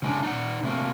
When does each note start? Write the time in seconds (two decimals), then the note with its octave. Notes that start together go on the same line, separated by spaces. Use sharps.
0.02 C#3 G#3 D4
0.22 D#4 D5 F#5
0.63 C3 A3 A#3